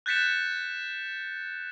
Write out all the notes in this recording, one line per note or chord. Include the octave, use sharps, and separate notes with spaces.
F#6 G6 A6 B6 C#7 E7